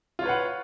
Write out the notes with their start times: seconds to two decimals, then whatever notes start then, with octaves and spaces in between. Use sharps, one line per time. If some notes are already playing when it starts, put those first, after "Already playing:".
0.19 F4
0.22 C#5
0.26 B4
0.29 F#5